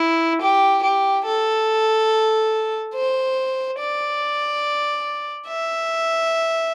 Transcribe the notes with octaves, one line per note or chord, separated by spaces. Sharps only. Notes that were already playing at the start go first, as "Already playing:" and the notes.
Already playing: E4
G4
G4
A4
C5
D5
E5